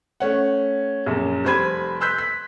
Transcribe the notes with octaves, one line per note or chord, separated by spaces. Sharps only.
A3 C#4 F#5
A#1 F#2
F1 G3 C5 B5 G#6 D#7
B4 C6 E6 F#6 G6 B6
B6